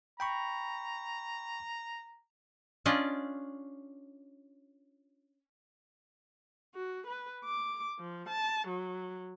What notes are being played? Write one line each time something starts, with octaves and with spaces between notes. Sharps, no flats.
G5 A#5 B5 C#6
C#4 D4 F4 D5 D#5
F#4
B4
D6
F3
A5
F#3